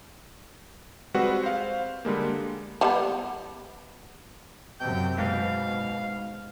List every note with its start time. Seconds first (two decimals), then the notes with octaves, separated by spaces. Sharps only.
1.14 G3 G#3 C4 F#4 B4 F#5
1.43 C5 F5
2.05 D3 G3 G#3 A#3
2.81 F3 G3 B3
4.80 F#2 C3 G5 G6
5.18 G#2 B2 F5